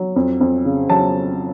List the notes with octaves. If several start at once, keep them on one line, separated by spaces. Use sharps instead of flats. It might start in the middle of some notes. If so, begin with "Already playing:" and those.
Already playing: F#3
F2
F2
C#3
F#3 A5